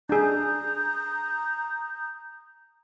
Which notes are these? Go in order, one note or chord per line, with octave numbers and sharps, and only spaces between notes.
D4 G#4 A#5 D#6 G6